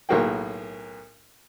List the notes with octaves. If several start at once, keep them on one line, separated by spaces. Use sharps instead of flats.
B1 A2 A#3 F#4 G#4 G5